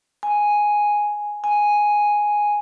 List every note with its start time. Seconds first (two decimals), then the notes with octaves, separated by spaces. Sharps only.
0.23 G#5
1.44 G#5